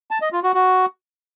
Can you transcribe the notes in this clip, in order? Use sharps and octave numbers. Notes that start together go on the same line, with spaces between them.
A5
D#5
F4
F#4
F#4